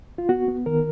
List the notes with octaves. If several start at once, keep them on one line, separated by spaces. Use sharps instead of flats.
F4
B3 F#4
B3
D#3 A#4